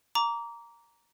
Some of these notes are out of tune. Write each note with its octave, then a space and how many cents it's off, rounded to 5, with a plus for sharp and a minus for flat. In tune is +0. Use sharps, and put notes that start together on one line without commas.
A#5 +0 D6 -25